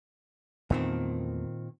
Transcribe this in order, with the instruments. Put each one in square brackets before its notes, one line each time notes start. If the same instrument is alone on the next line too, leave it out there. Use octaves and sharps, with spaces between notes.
[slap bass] E2 A3 B3 [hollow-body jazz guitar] A#2 D#3 C4